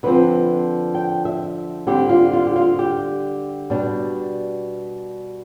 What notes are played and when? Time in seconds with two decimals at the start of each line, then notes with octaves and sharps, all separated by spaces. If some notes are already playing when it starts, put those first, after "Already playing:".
0.03 D3 F3 C4 B4
0.95 G5
1.25 E5
1.87 D3 G3 C4 G4
2.09 F4
2.33 F4
2.47 G4
2.56 F4
2.79 G4
3.70 B2 G3 D4